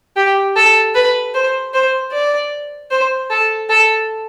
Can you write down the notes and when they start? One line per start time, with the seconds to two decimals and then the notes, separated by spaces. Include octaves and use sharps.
0.17 G4
0.56 A4
0.95 B4
1.34 C5
1.73 C5
2.12 D5
2.91 C5
3.30 A4
3.69 A4